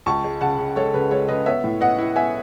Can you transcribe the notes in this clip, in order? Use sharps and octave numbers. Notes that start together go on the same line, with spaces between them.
C#2 A5 C#6
G#3
C#3 F#5 A5
C#3
G#3 A4 C#5
C#3 B4
G#3 A4 C#5
C#3 B4 D#5
B3 C#5 E5
A2
B3 D#5 F#5
E4
B3 E5 G#5